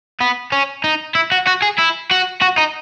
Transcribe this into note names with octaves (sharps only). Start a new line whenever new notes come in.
B3
C#4
D#4
E4
F#4
F#4
G#4
E4
F#4
F#4
D#4